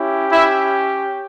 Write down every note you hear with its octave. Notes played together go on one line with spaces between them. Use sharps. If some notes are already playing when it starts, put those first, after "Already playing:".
Already playing: C#4 E4 G4
E4 E5